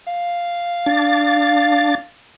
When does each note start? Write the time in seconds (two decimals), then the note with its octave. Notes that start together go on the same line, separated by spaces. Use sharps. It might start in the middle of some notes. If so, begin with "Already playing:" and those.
0.07 F5
0.86 D4 A6